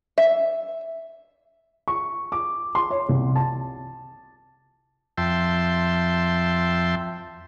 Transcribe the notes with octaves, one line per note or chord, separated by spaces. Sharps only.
E5
C#6
D6
C6
C#5
C2
A5
F2 E5 G5 A5 C6